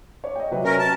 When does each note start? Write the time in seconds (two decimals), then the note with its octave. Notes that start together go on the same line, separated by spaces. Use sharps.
0.24 C#5 D5
0.35 D#5 G5
0.51 C3 F#3 B4
0.65 C#4 A#4
0.79 A5